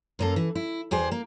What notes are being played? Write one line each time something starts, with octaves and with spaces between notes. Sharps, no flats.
F#2 A#3 A4
E3
E4
E2 G4 G#4 C5
A#3